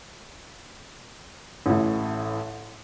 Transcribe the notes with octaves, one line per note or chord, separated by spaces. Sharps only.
A1 A2